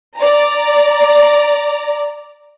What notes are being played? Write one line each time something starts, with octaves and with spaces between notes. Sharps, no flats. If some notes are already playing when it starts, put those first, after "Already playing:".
D5 A#5